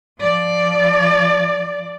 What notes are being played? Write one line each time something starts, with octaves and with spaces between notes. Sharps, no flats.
F3 D5